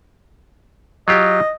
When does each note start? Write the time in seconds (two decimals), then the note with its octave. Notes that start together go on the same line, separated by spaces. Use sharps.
1.08 F#3 F4 G4 D#5